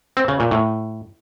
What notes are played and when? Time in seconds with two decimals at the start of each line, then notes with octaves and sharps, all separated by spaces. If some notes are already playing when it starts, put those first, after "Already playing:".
0.17 C4
0.28 C#3
0.40 A#2
0.51 A2